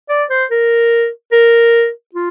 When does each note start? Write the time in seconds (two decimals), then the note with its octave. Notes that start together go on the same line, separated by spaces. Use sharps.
0.09 D5
0.30 C5
0.51 A#4
1.32 A#4
2.14 F4